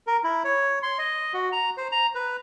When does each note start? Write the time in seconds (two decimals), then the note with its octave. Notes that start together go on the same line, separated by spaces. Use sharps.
0.07 A#4
0.24 E4
0.44 C#5
0.83 C6
0.98 D#5
1.34 F#4
1.52 A#5
1.77 C5
1.92 A#5
2.15 B4